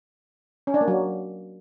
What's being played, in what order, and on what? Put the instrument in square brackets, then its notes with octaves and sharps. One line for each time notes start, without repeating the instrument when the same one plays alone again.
[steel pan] C#4
D4
A#3
F#3